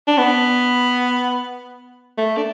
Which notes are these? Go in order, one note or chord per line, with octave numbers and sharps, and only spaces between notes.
D4
B3
A3
D4